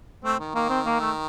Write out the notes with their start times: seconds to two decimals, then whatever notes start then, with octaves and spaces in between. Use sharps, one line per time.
0.24 A3 C4
0.39 D#3
0.55 D#3 A#3
0.69 C4
0.86 A#3
1.00 A3